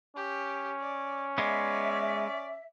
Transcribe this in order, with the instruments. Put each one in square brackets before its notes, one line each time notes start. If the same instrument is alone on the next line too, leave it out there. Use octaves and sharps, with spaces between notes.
[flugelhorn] C#4 [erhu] G4
[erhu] D5
[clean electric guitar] G#3 B3 [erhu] D5 [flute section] E5